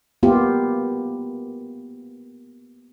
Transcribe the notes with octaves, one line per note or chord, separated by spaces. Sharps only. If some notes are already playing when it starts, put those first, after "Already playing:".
A#3 B3 F4 G4